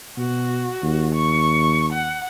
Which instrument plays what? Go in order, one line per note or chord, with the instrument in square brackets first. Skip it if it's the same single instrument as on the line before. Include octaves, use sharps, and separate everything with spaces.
[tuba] B2 [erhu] F#4
[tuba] D#2
[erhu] C#6
F#5